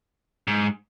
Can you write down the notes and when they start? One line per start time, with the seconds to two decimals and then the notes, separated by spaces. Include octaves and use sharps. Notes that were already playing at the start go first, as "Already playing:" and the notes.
0.47 G#2